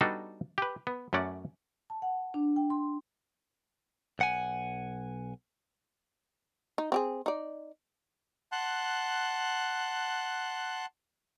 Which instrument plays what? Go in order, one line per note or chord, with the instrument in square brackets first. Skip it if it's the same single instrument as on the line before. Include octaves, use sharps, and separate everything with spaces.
[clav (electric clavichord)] G3 B3 D4 D#4 F#4 A4
G4 B4
B3
F#2 A3 C#4 D5 F#5
[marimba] A5
F#5
D4
G5
C6
[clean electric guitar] B1 F#5 G#5
[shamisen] D#4
C4 G4 G#4
D#4 D5
[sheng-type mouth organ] F#5 A5 C6 F#6